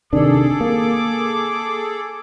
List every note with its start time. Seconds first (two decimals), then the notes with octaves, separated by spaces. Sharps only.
0.13 C3 D#3 D4 G#4 A4 D6
0.60 A#3